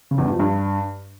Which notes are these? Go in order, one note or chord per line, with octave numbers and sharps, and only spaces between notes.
C#3
E2
G2
F3
G2